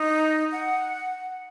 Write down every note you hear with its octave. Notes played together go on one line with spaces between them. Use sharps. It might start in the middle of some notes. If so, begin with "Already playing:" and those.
Already playing: D#4
F#5